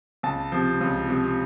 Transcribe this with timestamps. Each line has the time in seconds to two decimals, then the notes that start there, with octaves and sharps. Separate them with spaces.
0.23 C#2 A5
0.52 C3 F3
0.81 C#2
1.09 C3 F3